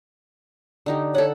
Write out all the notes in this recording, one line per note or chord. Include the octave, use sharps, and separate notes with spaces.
D3 D#4 G4
A4 C#5 F#5